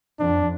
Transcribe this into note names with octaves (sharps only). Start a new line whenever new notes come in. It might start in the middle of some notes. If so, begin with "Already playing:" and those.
F2 D4